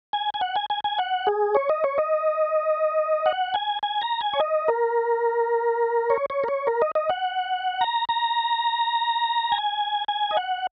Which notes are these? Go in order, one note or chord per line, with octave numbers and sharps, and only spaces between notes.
G#5
G#5
F#5
G#5
G#5
G#5
F#5
G#4
C#5
D#5
C#5
D#5
F#5
G#5
G#5
A#5
G#5
C#5
D#5
A#4
C#5
C#5
A#4
C#5
A#4
D#5
D#5
F#5
A#5
A#5
G#5
G#5
D#5
F#5